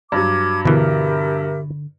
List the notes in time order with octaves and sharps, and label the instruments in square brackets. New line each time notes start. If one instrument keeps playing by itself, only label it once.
[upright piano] G2 F#3 [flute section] D6 G#6
[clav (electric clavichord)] B2 E3 [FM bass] D3 [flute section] G4 A#4 E5